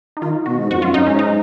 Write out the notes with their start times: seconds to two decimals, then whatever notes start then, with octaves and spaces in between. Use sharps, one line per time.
0.17 D#4
0.22 D#3 F4
0.46 B2 F#4
0.58 G#2
0.70 F2 F#4
0.82 F#2 F4
0.94 F#2 D#4
1.07 G#2 C#4
1.19 D#4